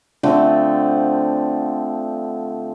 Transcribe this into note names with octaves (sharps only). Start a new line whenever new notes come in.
D3 F3 A3 C4